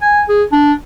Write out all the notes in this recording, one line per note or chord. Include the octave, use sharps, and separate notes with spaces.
G#5
G#4
D4